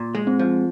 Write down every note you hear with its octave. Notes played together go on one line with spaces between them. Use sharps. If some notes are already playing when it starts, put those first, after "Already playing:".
Already playing: A#2
G#3
C4
F3